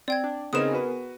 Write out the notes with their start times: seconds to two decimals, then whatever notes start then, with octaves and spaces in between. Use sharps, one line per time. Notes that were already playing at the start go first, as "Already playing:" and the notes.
0.08 C4 D5 G5 G#6
0.24 D4
0.53 C#3 B3 C4 D#4 G#4 A#4 D#6 E7
0.72 F#4 B4